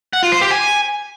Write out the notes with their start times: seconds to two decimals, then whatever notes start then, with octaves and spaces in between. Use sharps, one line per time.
0.13 F#5
0.23 F4
0.32 C5
0.41 G4
0.51 G#5